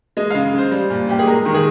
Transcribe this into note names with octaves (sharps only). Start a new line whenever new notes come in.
G#3 D#5
F5
C#3
C#3 C5
G3
A#2
A#2 G4
G#4
G#3 A#4
D#3
G#4